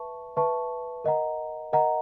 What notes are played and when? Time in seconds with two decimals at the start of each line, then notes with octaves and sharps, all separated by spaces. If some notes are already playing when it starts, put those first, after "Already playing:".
Already playing: B4 E5 A5 C#6
0.36 B4 E5 A5 C#6
1.04 A#4 D#5 F#5 A#5
1.73 A#4 D#5 F#5 A#5